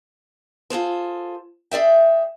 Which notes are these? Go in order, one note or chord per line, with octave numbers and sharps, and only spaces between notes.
F4 G#4 A4 C5
G#4 D5 E5 G5